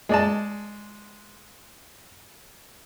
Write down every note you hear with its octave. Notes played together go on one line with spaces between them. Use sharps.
G#3 D5 A5